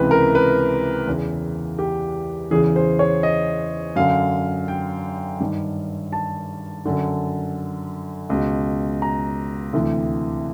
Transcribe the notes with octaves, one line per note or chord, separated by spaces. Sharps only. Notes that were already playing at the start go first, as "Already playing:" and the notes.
Already playing: C#2 C3 E3 B4
A#4
B4
E2 C#3 E3
G4
E2 C#3 E3 G#4
C5
C#5
D#5
F#2 D3 F5
G5
G2 D#3
A5
F#2 D3
C#2 B2
A#5
D2 C3 E3